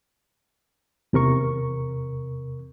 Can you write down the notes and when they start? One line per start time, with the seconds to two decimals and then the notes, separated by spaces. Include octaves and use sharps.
1.13 E2 C3 A#4 C#6